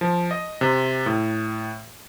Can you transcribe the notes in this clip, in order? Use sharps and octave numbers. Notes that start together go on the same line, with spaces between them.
F3
D#5
C3
A2